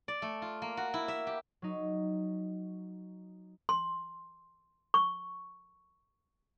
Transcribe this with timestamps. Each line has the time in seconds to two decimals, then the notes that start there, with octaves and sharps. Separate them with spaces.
0.08 D5
0.22 A3
0.42 F4
0.62 A#3
0.77 F#4
0.94 E4
1.08 E5
1.27 G4
1.62 F#3 D#4
3.69 C6
4.94 C#6